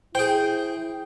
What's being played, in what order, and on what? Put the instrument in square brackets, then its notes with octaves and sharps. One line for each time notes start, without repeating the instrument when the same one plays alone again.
[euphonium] E4 [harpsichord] G#4 C5 [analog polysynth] G5